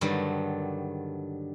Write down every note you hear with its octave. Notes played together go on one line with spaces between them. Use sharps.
G2 D3 D#3 F#3 G3